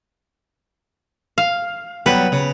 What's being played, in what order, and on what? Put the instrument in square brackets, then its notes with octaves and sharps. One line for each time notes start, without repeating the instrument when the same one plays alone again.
[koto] F5
[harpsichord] F#3 G3 B3 [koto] B4
[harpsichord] C#3